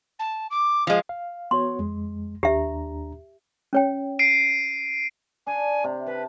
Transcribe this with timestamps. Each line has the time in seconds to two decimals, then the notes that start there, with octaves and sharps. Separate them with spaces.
0.19 A5
0.50 D6
0.87 F3 G#3 F5
1.09 F5
1.51 B3 F#4 C#5 C6
1.79 F2 G#3
2.43 D#2 D4 G4 E5 A#5
3.73 C#4 C#5 G5
4.19 C7 D7 D#7
5.47 D4 G#5
5.84 C3
6.07 B4 A5